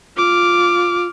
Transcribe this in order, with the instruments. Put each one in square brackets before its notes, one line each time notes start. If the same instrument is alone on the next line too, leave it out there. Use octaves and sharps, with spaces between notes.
[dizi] F4 [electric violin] D6 F6